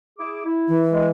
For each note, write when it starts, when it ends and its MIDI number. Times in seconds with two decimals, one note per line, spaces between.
0.19 0.43 64
0.19 0.43 68
0.19 0.43 86
0.45 0.85 64
0.68 1.11 52
0.92 1.08 56